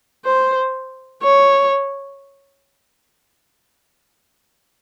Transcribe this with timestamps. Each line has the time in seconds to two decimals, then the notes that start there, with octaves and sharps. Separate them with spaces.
0.25 C5
1.23 C#5